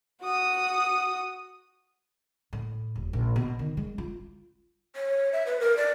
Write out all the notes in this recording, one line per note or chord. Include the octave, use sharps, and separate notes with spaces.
F#4 D#6
A2
E1
A#1
B2
D#3
G#3
F4
C#5
E5
B4
A#4
D5